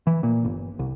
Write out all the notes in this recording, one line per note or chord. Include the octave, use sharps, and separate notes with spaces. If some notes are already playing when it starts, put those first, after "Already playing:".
E3
A#2
G1
C2